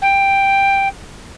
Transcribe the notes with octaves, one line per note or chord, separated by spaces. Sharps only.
G5